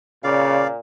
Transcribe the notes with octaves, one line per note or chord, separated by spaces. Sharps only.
A#2 C#3 D5 F5